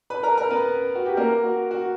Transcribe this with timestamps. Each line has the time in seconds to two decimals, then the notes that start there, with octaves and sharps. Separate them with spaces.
0.10 B4 B5
0.23 A#4 A#5
0.37 A#4 A#5
0.50 B3 B4
0.95 F#4
1.06 G4
1.17 A#3 A#4
1.43 F#4
1.71 F#4